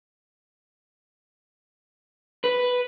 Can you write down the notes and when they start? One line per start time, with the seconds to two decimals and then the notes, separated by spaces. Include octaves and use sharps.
2.44 B4